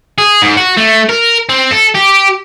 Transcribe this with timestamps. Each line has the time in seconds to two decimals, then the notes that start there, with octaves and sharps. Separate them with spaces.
0.18 G#4
0.42 G#2
0.57 F#4
0.77 A3
1.09 A#4
1.49 C4
1.71 A4
1.95 G4